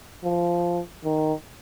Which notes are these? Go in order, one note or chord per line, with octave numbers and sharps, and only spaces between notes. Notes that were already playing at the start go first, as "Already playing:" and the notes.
F3
D#3